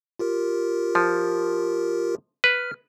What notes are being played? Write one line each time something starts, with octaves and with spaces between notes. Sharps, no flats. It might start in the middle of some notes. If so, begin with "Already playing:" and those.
F4 G4 A#4
F3
B4 F6